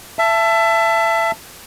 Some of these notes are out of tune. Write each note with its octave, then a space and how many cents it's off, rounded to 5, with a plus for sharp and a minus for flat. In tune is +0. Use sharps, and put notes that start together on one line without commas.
E5 +25 A5 +5